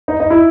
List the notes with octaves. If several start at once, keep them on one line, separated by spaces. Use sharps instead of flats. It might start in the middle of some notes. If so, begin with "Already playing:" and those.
D#4
D#4
E4